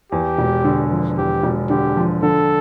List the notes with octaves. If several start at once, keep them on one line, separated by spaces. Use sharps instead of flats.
E2 G4
E1
D3
F3
E2 G4
E1
D3 G4
F3
D3 A4